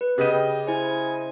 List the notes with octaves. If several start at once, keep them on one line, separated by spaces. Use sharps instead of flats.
B4
C#3 B3 G4 D#5 G6 D#7
G5
E4 C5 G#5